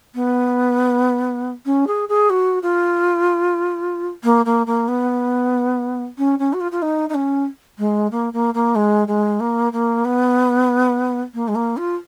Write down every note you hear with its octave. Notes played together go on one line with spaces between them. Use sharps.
B3
C#4
G#4
G#4
F#4
F4
A#3
A#3
A#3
B3
C#4
C#4
F#4
F4
F4
D#4
D#4
C#4
G#3
A#3
A#3
A#3
G#3
G#3
A#3
A#3
B3
A#3
G#3
A#3
F4